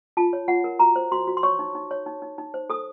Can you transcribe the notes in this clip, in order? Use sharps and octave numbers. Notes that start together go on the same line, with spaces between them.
F4 A5
C#5
F4 F#5
A#4
F#4 A#5
C5
F#4 C6
F#4
C6
C#5 C#6
D#4
D#4
C#5
D#4
D#4
D#4
C5
A4 D#6